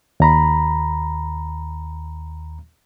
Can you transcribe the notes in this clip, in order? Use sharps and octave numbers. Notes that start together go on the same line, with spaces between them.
D#2 A#5 B5